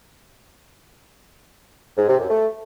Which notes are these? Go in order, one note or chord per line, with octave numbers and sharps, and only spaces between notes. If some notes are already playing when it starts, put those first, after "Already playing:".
G#2
C3
F#2
A3